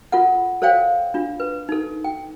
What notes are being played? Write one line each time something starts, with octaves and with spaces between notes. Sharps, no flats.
F4 A4 F#5
A4 C5 C#5 F5 G5
D4 F4
B4
D#4 A4
G5